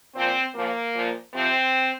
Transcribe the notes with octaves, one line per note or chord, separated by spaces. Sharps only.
A#2 F3 C4
A#2 F3 A#3
A#2 F3
C3 F3 C4